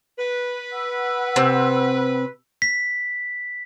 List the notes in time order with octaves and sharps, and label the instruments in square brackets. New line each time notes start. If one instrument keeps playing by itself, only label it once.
[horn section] B4
[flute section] F#5 E6
[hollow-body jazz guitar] C3 [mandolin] C4
[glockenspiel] B6